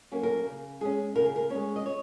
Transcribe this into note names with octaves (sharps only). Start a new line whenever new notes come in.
F#3 A#3 C#4
A#4
C#3
G#3 C#4 G#4
C#3 A#4
G#4
A#4
G#3 C#4 C#5
D#5
C#5